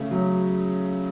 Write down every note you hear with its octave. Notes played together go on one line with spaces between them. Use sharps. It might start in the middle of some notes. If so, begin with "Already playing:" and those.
Already playing: C#3 A3
F#3